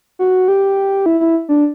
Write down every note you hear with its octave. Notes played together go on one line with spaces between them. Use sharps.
F#4
G4
E4
E4
D4